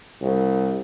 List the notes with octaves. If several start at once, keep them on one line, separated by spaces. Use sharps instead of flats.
C2